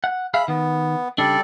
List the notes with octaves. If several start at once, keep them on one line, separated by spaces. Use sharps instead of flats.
F#5
G#4 E5 F5 B5
D#3 B3
C#3 G3 D4 A4 D5